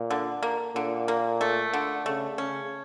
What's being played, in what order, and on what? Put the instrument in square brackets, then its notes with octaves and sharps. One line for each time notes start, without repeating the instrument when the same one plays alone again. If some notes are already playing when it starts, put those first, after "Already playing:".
Already playing: [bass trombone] A#2
[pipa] D3
A#3
[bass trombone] A#2 [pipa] D3
[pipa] A#3
A3
D3
[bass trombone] C#3 [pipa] A3
[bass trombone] C#3 [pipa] C#4